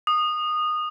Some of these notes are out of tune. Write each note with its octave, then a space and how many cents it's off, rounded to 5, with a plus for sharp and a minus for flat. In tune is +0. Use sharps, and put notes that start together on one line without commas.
D#6 -20